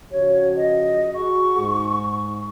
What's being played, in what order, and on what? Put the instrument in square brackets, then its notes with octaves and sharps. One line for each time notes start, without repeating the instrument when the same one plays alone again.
[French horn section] C#3 F3 F#4 [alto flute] C#5
[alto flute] D#5
[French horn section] F#4 G#4 [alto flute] C#6
[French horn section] G#2